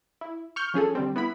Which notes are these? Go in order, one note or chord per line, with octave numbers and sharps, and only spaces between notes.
E4
C#6 F6 G6
F3 C#4 G#4 A4
D3 G3 C4
B3 E4 B5